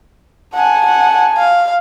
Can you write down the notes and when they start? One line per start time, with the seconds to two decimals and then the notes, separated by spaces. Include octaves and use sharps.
0.54 F#5 G#5 A5
0.86 F#5
1.38 F5